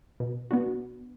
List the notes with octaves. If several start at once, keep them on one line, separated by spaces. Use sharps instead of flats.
B2
B3 D4 F#4